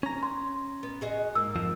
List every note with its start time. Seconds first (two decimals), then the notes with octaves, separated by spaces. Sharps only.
0.03 C#4 A#5
0.23 C6
0.83 B3
1.01 F#4 G#4 D#5
1.35 G#2 A#3 E6
1.56 F2 F3